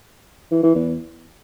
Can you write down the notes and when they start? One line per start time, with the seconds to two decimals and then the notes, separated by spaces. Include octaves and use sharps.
0.52 E3
0.63 E3
0.75 E2